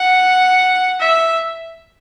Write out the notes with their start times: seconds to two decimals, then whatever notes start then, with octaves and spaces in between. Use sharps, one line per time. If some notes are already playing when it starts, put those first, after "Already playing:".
Already playing: F#5
1.00 E5